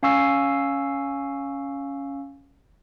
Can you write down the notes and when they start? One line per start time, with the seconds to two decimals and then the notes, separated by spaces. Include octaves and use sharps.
0.03 C#4 F5 G#5 C#6 E6 C7